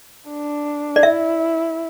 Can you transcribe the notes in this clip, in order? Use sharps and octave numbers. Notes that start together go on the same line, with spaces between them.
D4
D5
E4 E5